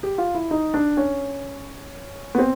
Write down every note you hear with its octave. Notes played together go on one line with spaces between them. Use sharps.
G4
F4
E4
D#4
D4
C#4
B3
C4